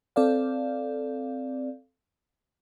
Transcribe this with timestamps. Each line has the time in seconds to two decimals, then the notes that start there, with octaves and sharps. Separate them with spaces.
0.16 C4 A4 D5 F5